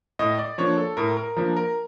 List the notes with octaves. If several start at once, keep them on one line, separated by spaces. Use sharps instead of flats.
A2 D#5
D5
F3 A#3 D4 C#5
A4
A2 A#4
A#4
F3 A#3 D4 A#4
A#4